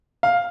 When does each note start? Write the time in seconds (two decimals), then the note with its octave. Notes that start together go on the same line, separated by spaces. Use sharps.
0.23 F5